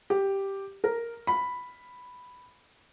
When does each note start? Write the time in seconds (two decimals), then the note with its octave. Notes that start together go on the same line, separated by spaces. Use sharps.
0.10 G4
0.84 A#4
1.27 B5